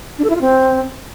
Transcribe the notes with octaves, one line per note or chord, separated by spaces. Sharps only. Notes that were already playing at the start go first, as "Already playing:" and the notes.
D4
A4
E4
F4
C4